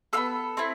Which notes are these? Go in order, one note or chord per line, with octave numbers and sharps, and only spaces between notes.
B3 F4 A4 E6
A3 C4 E4